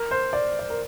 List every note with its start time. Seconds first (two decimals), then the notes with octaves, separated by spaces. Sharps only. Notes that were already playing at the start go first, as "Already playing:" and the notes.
Already playing: A#4
0.11 C5
0.33 D5
0.59 D5
0.70 A#4